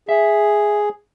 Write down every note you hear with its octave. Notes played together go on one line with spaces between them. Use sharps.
G#4 E5